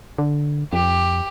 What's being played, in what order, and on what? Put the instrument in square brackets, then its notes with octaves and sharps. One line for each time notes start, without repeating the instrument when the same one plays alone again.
[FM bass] D3
[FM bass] F2 [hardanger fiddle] G4